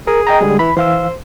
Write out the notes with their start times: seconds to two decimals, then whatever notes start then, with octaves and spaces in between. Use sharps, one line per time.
0.07 G#4 A#4
0.27 D#5 G5 A#5
0.41 D3 G3 G#3
0.59 E3 B5
0.77 E3 C5 F5 E6